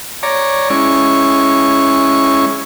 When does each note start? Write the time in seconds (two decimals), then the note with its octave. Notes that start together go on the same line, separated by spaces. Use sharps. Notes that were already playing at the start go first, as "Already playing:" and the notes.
0.23 C#5 D5 A#5
0.70 G#3 C#4 E4 C#6